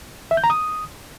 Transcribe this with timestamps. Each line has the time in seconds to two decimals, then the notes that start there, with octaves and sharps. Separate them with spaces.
0.31 E5
0.37 G6
0.44 A#5
0.50 D#6